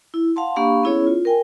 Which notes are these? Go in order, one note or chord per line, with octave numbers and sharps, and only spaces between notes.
E4
F5 F#5 A5 C6
A#3 D4 G4 F5 B5 C#6
B3 C#4 E4 G#4 C#5
F4
A#4 G5 G#5